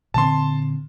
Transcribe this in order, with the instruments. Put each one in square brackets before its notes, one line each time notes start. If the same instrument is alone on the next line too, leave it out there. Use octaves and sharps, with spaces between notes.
[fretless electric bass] A#2 D3 C4 [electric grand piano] A5 C6